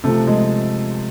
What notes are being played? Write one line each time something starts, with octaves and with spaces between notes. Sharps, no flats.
C3 F3 A3
G#3